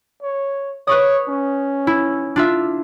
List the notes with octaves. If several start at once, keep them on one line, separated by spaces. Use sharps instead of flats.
C#5
B4 C#5 C#6 D#6
C#4
E4
D4 F4 E5